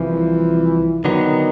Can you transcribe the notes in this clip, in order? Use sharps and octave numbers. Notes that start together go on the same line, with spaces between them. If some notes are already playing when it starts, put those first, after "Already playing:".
Already playing: C2 C3 E3 F3
D3 D#3 F#3 B3